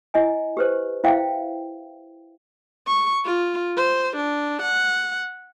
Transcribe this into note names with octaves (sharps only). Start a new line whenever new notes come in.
E4 D#5 G#5
G4 B4 C5
E4 C5 E5 F5 G5
C#6
F4
C5
D4
F#5